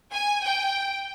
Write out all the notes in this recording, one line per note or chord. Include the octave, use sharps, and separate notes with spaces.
G#5
G5